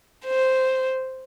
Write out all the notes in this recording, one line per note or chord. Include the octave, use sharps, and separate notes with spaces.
C5